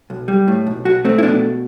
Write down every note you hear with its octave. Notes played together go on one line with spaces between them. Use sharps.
B1
G3
A2
B1
B1 F#4
A3 C4
E4
B2 D4